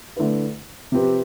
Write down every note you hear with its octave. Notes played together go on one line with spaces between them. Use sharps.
D3 A3 E4 B4
C3 F3 C4 G4 B4